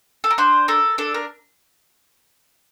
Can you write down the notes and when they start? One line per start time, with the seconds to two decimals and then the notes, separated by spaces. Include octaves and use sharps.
0.24 A4
0.31 A#4
0.38 D4 C5
0.68 A4 A#4
0.98 D4 A4
1.15 A#4